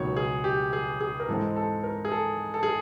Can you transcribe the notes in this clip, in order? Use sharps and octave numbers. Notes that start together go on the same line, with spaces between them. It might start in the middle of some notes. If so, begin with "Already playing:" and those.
Already playing: C#2 B2 F#3 A#3 D#4 C#5
G#4
G4
G#4
G#4
A#4
G#2 E3 G#3 C4 A4
A4
A#4
G#4
A4
A4
G#4